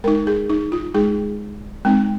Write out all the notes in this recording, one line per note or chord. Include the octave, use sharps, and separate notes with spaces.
G#3 D#4 A#4
G#4
D#4
F4
G#3 D#4 G#4
G#3 C4 D#4